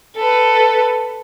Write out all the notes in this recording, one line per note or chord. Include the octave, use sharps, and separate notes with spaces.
A4 B4